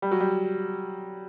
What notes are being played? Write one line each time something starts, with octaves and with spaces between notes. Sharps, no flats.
G3
F#3
G3